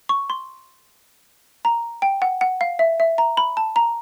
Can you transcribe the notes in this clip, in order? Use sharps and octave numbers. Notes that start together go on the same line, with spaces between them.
C#6
C6
A#5
G5
F#5
F#5
F5
E5
E5
A#5
B5
A5
A#5